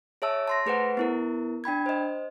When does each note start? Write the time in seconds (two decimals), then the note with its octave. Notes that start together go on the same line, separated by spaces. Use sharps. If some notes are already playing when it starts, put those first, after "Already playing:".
0.22 G#4 C#5 E5 A5 E6
0.48 A5 C6 A#6
0.66 A3 G#4 B4 C5 F#5
0.97 B3 E4 A#4
1.64 D4 G5 B5 G#6
1.86 C5 D#5